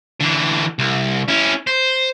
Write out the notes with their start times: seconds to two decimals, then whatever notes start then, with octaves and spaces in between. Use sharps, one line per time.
0.20 D3 E3
0.79 C2
1.28 C#4 E4
1.67 C5